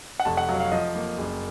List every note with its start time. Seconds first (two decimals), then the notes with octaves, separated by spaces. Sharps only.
0.20 F#5
0.25 F1 A5
0.37 F#5
0.49 F#3 F5
0.60 F5
0.72 F3 D#5
0.95 A#3
1.18 F#1